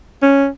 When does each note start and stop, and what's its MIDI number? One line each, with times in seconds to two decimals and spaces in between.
0.22 0.47 61